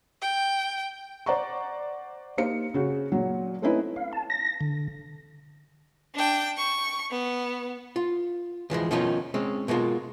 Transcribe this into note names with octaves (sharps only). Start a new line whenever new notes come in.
G5
C5 D5 F#5 A#5 C#6
A#3 D#4 G4 C5 F5 C#7
C#3 F#4
A#2 F#3
A3 C4 C#4 D#4 E4 B4
F5
A5
A#6
D3
D4 G5
C#6
B3
F4
D2 E3 F3 G#3
B2 D#3 F3 C#4 D#4 F4
G#3 C4 C#4
B2 G#3 A#3 F4